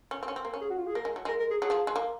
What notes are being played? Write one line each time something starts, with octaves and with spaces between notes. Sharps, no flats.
C#4
C4
C#4
C4
A#3
C#4
G#4
F#4
F4
G#4
A#3 A#4
G#3
F#3
G#3 A#4
A#4
G#4
F#3 G#4
F3
G#3
A#3